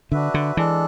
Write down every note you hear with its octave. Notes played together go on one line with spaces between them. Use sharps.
D3 D4 F#4 B4 E5
D3
E3 G#3 D4 A4